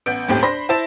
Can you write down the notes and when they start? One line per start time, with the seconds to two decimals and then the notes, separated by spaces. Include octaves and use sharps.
0.06 A1 B3 G6 D7
0.28 G1 D#2 A2 C4 G4 G5
0.42 D4 C5 B5 C6 A#6
0.69 E4 C5 E5 A5 A6 E7